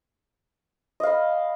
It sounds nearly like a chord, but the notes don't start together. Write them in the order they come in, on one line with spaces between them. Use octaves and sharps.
D#5 F5 B5